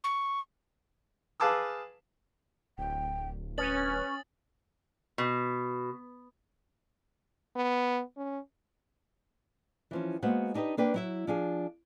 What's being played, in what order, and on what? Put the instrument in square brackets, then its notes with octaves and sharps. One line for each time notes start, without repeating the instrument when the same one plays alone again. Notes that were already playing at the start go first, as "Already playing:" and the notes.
[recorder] C#6
[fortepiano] G#4 B4 F5 A5 D6 E6
[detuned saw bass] D1 [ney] G5
[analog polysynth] C#4 [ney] B4 [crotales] D#6 A6 F#7
[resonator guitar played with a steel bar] B2
[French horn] B3
C#4
[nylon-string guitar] E3 F3 C#4
G#3 A#3 B3 F#4 C5 F#5
D4 D#4 G4 B4 D#5
A#3 D4 B4 G5
F#3 E4 E5
F3 D4 G#4